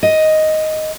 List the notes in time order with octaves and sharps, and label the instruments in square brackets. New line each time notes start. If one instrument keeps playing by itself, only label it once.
[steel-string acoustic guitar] D#5